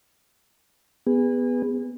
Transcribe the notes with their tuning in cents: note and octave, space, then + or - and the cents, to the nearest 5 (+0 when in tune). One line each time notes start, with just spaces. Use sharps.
B3 +0 G#4 -30